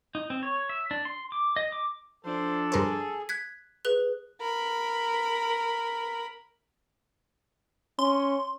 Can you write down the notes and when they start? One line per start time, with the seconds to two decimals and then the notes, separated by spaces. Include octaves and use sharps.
0.15 D#4
0.30 C4
0.43 C#5
0.69 E5
0.91 D4
1.05 C6
1.32 D6
1.56 D#5
1.72 D6
2.25 F3 D4 A4 C5
2.72 G2 G#4 A#4 C5
3.29 F#6 G#6 B6
3.85 G#4 B4 F#6 G7
4.41 A#4 B5
7.99 C#4 C6